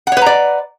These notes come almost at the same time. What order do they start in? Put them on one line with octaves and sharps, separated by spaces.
F#5 C#5 B4 A#5 D5